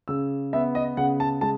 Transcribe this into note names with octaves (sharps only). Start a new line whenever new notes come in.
C#3 E6
B3 E5
D#5
C#3 F#5
A5
G#3 A5